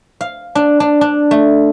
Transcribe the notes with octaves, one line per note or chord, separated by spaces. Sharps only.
F5
D4
D4
D4
A3